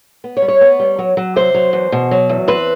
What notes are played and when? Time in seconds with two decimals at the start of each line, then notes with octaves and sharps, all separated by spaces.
0.24 B3
0.37 C#5
0.42 G3
0.48 C#5
0.61 B3
0.80 G3
0.99 F#3
1.17 F#3
1.36 C3 C5
1.54 F#3
1.73 E2
1.92 B2
2.11 F#3
2.29 E2
2.48 C4 B4